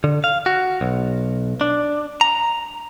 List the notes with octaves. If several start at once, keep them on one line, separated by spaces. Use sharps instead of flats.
D3
F5
F#4
B1
D4
A#5